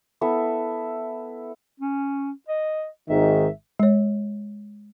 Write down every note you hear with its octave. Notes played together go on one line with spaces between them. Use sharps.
B3 E4 A4 E5
C#4
D#5
G#1 G#2 D#3 E5
G#3 C#5